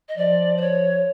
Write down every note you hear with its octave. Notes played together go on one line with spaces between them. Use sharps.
D#5
F3 D5
C5
C#5